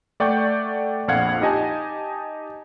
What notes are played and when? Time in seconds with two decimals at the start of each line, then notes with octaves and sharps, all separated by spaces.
0.20 A3 D5 F#5 G5 C#6 G6
1.08 A#1 F2 F5 F#5 G#6
1.41 D#4 G4 D#5 G#5 A5